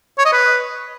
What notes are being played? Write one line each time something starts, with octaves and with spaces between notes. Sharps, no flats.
C#5
D#5
B4